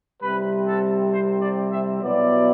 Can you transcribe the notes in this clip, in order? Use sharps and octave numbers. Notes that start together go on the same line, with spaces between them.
C2 C3 G3 C4 B4
A4
C5
D5
E5
B2 F#3 B3 E4 D5